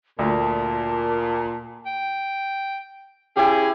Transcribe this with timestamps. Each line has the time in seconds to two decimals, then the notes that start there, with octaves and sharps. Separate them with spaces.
0.19 D2 A#2 A5
1.87 G5
3.37 C#4 E4 G4 G#4